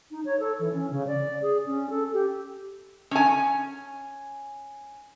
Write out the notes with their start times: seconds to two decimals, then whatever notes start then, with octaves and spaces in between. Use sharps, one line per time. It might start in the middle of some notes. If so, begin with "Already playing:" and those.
0.11 D#4
0.25 C#5
0.40 A4
0.59 E3
0.73 C#4
0.91 C#3
1.07 D5
1.42 G#4
1.66 C#4
1.90 A4
2.13 G4
3.11 C#4 G#5